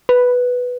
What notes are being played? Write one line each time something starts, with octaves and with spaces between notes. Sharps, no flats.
B4